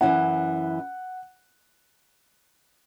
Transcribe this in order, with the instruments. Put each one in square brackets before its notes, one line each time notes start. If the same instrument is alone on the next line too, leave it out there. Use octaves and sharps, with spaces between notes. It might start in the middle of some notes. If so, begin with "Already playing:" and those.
[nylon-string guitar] F#2 E3 C#4 E4 [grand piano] F#5